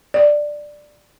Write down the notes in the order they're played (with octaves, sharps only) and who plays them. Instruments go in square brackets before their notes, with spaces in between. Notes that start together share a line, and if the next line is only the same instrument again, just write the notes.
[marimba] D5